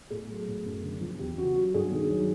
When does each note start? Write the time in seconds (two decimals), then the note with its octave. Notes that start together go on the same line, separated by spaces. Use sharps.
0.10 A2 G#4
0.29 F#3
0.48 A2
0.65 F#2
0.83 D3
1.01 F3
1.19 E2 G4
1.37 C#3 F#4
1.56 F#3 F#4
1.74 G2 G#4
1.92 D#3
2.10 F#3